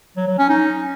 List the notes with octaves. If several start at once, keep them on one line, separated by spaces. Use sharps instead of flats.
F#3
F#3
C#4
D#4